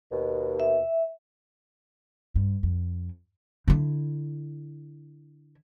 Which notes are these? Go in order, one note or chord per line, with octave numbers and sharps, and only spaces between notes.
D#2 B2
E5
G2
F2
D3 E4